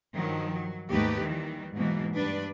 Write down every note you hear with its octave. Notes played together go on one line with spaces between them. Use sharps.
G2 D#3 F3 F#3
F#3
D#2 G#2 A3 D#4 G4 B4
D#3 E3 G3
G#2 B2 E3 F#3 A#3
G2 D4 B4 D5